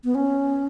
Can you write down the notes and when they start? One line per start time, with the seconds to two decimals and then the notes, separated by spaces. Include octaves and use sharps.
0.04 B3
0.15 C#4